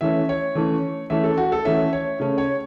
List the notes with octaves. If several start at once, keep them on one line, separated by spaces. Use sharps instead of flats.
E3 A3 C#4 E5
C#5
E3 A3 C#4
E3 A3 C#4 E5
A4
F#4
A4
E3 A3 C#4 E5
C#5
C#3 A3 C#4
C#5